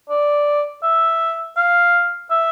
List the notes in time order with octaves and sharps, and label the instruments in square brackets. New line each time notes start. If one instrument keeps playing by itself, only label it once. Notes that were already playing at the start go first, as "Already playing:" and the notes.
[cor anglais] D5
E5
F5
E5